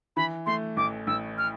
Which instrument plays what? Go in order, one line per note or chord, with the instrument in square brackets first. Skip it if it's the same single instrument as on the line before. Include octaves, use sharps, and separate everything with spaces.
[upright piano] E3 [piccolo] B5
[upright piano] A3 [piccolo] C6
[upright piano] A1 [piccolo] D6
[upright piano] A1 [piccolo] E6
[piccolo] F6